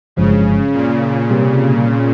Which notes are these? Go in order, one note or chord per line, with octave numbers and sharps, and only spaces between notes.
G1 G2 C#3 F3 G#3
A#2
C3 G3 C4 G4